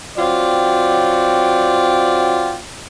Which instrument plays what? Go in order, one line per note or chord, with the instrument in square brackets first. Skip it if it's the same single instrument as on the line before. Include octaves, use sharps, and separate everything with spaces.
[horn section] F#3 C4 F4 D5 G5